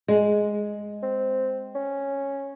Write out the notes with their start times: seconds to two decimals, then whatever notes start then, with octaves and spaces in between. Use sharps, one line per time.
0.08 G#3
1.02 C4
1.75 C#4